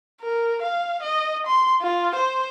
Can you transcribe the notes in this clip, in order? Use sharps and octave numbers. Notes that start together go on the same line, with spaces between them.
A#4
F5
D#5
C6
F4
C5